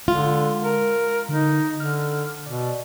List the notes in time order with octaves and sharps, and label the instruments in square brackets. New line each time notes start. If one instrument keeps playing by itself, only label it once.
[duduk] D3 [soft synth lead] G#3 [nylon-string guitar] F4
[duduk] A#4
[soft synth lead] D3 [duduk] D#4
[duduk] D3 [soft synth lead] F6
[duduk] B2 [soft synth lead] D5